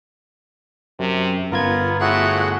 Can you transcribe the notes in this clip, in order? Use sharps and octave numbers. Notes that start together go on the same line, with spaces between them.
F#2 C3
G1 B3 F4 A#4 G#6
A2 F#4 G#4 E5 F#5